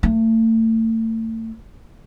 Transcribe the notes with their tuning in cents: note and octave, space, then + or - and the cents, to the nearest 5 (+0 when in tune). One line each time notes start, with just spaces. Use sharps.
A3 +35